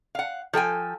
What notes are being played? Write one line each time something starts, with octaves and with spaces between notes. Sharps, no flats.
F5 F#5
F3 A4 G5 G#5